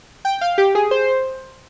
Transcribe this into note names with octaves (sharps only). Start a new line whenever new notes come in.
G5
F5
G4
G#4
C5